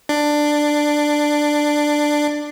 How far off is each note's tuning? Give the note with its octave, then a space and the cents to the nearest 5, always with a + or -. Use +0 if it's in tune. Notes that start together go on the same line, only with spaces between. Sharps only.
D4 +10